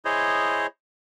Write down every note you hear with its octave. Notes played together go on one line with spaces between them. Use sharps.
E4 G#4 C5 C#5 D#5